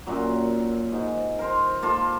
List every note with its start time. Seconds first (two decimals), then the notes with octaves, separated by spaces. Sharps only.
0.07 F#2 A#2 F#3
0.92 G#2
1.39 A#4 C5
1.82 A#3 F4 A4